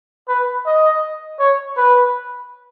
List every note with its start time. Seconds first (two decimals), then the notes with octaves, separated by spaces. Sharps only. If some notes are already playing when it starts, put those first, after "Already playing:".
0.28 B4
0.66 D#5
1.39 C#5
1.77 B4